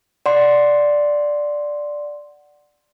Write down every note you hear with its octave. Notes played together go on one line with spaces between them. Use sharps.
D5 F#5 C6